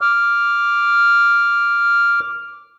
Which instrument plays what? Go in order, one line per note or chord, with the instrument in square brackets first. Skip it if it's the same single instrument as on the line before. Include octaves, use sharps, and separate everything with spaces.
[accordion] D6 F6